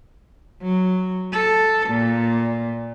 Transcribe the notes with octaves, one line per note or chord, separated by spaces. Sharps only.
F#3
A4
A#2